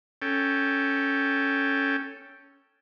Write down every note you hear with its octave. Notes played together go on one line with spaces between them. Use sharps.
C#4 A4 G5